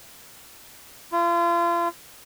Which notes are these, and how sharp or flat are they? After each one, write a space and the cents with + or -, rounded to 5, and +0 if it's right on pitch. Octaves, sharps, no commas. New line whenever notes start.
F4 -35